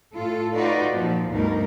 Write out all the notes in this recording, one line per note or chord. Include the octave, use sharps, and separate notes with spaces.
A2 F4 A4
D#4 F4 F#4 B4 D5
A#2 F3
D2 G2 B2 D#4 A#4